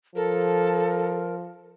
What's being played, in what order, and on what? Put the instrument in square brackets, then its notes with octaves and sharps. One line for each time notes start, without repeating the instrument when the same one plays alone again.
[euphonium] F3 [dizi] A4 [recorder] A#4